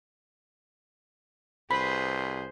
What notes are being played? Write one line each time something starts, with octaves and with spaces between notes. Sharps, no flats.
C2 G#4 B4 C5 B5